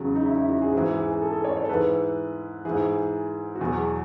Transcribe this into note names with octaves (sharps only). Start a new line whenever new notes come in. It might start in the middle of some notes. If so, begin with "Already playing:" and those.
Already playing: E2 C#3 F#3
D#4
E4
E4
F#4
G#4
G#2 E3 G#4
G#4
G#4
A4
A4
C#5
C#5
A4
G#2 E3 B4
G#2 E3 G#4
F#4
E2 B2 F#3 G#4